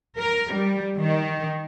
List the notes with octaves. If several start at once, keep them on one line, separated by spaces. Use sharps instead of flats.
A#4
G3
D#3